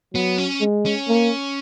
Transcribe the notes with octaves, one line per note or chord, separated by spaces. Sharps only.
F#3 B3
C#4
G#3
C#4
A#3